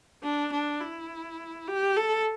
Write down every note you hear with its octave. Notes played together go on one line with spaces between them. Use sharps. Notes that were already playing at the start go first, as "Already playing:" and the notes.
D4
D4
E4
G4
A4